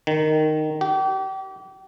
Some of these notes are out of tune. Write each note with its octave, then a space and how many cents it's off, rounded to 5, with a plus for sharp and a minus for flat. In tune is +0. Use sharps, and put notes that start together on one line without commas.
D#3 -10
G4 -35